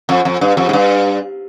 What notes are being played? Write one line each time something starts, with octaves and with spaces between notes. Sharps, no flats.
F2
F2
G2
F2
G#2
G2